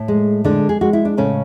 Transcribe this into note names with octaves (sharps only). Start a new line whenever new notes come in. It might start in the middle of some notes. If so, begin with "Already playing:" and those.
Already playing: A2
G#3
D3 G#3 D4
G#4
G#3 F#4
E4
D4
A2 C#3 C#4